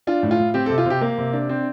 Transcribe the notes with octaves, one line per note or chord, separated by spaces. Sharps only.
D4 F4
A2
F4
A2
C4 G4
A4
C3
F4
C3 G4
A#3
C3
D4
C4